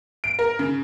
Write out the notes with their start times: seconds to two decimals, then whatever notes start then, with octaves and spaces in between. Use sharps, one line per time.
0.24 D7
0.39 A#4
0.59 C#3